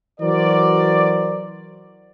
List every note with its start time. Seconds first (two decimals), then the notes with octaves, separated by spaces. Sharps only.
0.21 E3 F#3 F#4 A#4 C5 D5